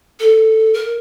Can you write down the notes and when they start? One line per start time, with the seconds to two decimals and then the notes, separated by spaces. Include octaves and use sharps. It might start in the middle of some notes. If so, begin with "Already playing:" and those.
0.20 A4
0.74 A#4